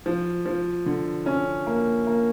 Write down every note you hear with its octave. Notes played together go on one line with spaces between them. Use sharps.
F3
F3
D3
C#4
A#3
A#3